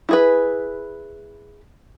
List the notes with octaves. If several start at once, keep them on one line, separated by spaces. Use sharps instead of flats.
E4 G#4 B4